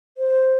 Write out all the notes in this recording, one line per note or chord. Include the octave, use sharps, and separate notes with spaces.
C5